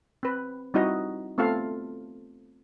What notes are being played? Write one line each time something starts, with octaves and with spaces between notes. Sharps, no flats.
C4 B4
G3 C4 D#4 E4 F#4 D#5
A3 B3 C4 F4 A4 F5